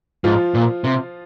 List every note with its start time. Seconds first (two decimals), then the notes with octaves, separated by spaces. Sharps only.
0.24 G#2 F3 F4
0.54 A#2
0.84 C3